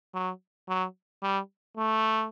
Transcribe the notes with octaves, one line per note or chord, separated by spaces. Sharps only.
F#3
F#3
G3
A3